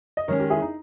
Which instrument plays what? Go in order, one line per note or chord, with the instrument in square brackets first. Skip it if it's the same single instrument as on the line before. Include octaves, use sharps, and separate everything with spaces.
[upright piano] D#5
[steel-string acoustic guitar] D#3 G#3 C#4 [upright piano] A#4 C#5
[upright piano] G4 A#4
E4 G#4
D#4